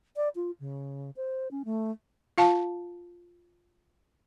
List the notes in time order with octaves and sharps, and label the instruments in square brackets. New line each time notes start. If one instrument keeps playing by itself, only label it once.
[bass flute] D5
F4
C#3
C5
C#4
A3
[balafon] F4 F5 A5